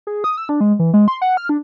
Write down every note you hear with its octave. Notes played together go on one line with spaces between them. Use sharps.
G#4
D#6
E6
D4
G#3
E3
G#3
C6
F#5
F6
D4